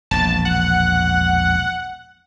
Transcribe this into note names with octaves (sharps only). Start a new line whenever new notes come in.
E1 A#1 A5
F#5